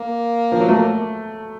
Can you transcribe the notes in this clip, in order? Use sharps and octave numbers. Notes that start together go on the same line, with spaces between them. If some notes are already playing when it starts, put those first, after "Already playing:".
Already playing: A#3
F3
F#3
A3